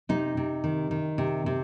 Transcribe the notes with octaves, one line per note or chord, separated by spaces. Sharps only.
C3 D#4
C3
D#3
D#3
C3
C3